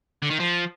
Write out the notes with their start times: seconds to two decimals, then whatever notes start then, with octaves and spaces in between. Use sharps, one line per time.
0.22 D3
0.30 D#3
0.40 F3